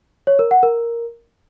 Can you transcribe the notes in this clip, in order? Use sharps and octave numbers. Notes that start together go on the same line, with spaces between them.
C#5
A#4
F#5
A#4